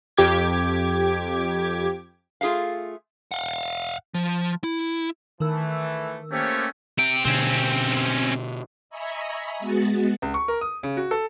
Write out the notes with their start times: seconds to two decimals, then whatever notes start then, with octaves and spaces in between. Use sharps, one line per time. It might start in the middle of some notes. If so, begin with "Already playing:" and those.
0.17 F2 G4 D6 G#6
2.41 A3 F4 G#4 E5 F5
3.32 F5 F#5
4.14 F3
4.64 E4
5.40 D#3 E3 A3 A#4 E6
6.32 A3 A#3 C#4 G4 C5 C#5
6.99 C3 G5
7.25 B2 D3 C4 C#4
8.89 D#5 E5 G#5 A#5 B5 C#6
9.59 G#3 B3 F#4 A6
10.22 C#2
10.34 C#6
10.48 A#4
10.61 D#6
10.83 C#3
10.97 F#4
11.11 A4